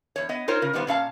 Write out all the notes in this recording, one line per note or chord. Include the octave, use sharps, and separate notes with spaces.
E2 C#5
B3 D#5
D#4 F4 A#4 C5 C#5
C#3 A#4
D#3 G3 A3 B3 C5 F5
A#2 C#4 F5 A5